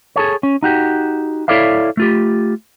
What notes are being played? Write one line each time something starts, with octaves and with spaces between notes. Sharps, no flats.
G#4 A4 C#5
C#4
D#4 F#4 G4
E4 A4 C#5 D5 E5 F5
A3 F4 G4